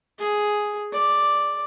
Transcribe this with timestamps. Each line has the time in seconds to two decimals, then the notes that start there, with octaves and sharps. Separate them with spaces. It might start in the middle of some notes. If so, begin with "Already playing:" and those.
0.19 G#4
0.92 D5